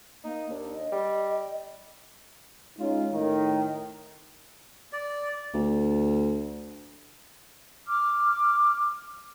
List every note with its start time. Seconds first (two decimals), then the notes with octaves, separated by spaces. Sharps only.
0.24 A#3 D#4
0.50 D#2 D4
0.74 D#5
0.92 G3
2.79 G#3 C#4 D#4 F4
3.13 A2 D#3
4.93 D5
5.54 D2
7.85 D6 F6